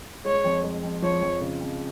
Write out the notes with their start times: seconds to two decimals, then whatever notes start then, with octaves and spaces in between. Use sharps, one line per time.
0.25 G#3 C#5
0.45 F2
0.64 G#3
0.83 F2
1.02 F3 C#5
1.22 F2
1.41 C#3
1.61 F2